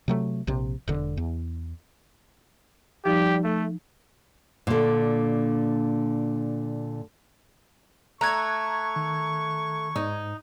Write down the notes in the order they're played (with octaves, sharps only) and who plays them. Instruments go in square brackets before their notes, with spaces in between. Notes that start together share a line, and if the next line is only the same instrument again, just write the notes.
[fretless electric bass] C3 F#3 A3
A#1 C3
E1 D3
E2
[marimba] F3 D#4 [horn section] G3 G4
[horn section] A3
[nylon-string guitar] A#2 D3
[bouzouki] A3 [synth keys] A#5 F#6 G#6 [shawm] C#6
[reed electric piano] D#3
[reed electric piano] G#2 [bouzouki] D#4